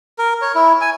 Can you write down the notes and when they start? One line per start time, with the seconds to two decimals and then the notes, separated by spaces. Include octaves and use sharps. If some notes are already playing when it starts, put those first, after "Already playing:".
0.19 A#4
0.42 C#5
0.55 E4
0.81 G#5